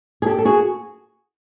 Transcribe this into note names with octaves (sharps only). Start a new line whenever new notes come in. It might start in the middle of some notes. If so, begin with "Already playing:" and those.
G#4
G4 A4
A4
F#4 G#4